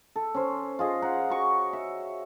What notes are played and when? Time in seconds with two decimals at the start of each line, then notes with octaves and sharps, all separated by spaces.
0.16 A4
0.34 C#4 C5
0.79 F4 G#4 D#5
1.02 F#5 A#5
1.30 F#4 C#6
1.73 E5